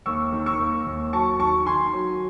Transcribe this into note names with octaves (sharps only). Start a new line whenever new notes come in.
D#2 C#6 E6
D#3
C#6 E6
D#2
D#2
F#3 A5 C#6
D#3 A5 C#6
D#3 G#5 C6
F#3